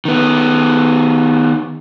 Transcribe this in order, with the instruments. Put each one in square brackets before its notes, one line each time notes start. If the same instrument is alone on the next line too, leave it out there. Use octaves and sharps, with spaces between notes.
[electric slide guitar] D#3 B3